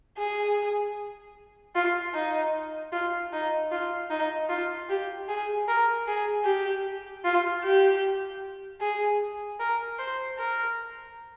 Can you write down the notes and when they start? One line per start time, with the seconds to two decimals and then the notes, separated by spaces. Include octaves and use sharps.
0.18 G#4
1.75 F4
2.14 D#4
2.92 F4
3.32 D#4
3.72 F4
4.10 D#4
4.49 F4
4.89 G4
5.28 G#4
5.68 A#4
6.07 G#4
6.45 G4
7.24 F4
7.64 G4
8.81 G#4
9.59 A#4
9.99 C5
10.38 A#4